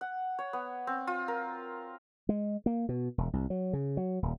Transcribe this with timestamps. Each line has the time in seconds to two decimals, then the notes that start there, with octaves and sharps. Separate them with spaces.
0.01 F#5
0.39 C#5
0.53 B3
0.87 C4
1.07 F4
1.28 A#4
2.29 G#3
2.66 A#3
2.89 B2
3.18 E1
3.33 C2
3.50 F#3
3.73 C#3
3.97 F#3
4.23 D#1